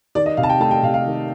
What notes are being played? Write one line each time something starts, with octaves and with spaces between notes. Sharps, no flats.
D#3 D5
D#5
C3 F5
A5
G5
A3 A5
G5
C3 F5
F5
D#3